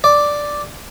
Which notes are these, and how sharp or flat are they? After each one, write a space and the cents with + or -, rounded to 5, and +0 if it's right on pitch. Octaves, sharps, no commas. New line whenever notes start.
D5 +0